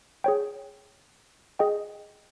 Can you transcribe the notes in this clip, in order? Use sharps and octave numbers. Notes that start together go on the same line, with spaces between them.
G#4 C#5 G5
G#4 D#5 G5